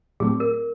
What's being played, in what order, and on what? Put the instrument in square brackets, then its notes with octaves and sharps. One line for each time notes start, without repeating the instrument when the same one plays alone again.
[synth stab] A2 F#3 A3 C4 [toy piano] G#4
[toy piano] A#4